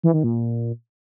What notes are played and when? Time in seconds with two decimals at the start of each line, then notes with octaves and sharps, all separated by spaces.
0.03 E3
0.14 D#3
0.24 A#2